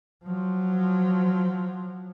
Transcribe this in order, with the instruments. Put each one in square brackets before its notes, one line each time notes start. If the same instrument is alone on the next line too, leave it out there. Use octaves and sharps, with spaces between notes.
[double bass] F3 F#3